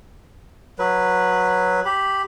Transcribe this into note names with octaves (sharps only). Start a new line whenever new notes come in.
F#3 B4
G4 B5